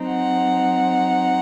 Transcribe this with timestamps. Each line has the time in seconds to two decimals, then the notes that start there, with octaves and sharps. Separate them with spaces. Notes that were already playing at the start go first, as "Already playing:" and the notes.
Already playing: F#3 C4 D#4
0.08 F#5